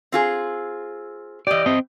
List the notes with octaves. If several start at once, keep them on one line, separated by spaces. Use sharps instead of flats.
C4 F4 G#4
E3 G4 D5 D#5
C4 D#5